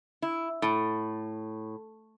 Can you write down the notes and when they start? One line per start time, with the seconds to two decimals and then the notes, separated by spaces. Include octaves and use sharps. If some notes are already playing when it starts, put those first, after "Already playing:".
0.22 E4
0.62 A2